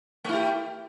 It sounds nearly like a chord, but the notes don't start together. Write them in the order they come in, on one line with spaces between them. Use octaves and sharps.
A3 E4 G4